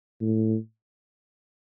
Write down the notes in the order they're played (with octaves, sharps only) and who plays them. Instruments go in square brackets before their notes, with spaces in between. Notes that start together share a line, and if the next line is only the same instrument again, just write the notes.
[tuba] A2